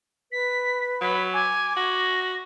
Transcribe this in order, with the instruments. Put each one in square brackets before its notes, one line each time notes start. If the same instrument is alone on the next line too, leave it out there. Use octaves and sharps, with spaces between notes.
[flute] B4 [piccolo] B6
[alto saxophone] F#3 [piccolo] B5
[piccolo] G#5 [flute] D6
[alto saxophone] F#4 [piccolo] A#6